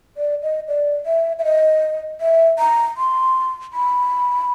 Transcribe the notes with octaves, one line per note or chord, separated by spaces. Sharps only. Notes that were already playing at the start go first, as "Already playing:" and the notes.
D5
D#5
D5
E5
E5
D#5
E5
A#5
C6
B5